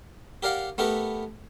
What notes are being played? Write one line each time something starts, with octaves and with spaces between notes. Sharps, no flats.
G4 A#4 D5 F5 F#5
A3 B3 G4 A#4 B4